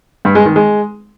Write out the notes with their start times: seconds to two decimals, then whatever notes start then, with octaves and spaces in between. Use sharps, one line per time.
0.25 G2
0.35 G#3
0.46 D#3
0.56 G#3